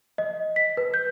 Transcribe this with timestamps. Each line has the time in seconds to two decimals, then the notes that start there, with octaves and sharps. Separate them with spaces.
0.18 D#5
0.56 B6
0.77 B4
0.94 G6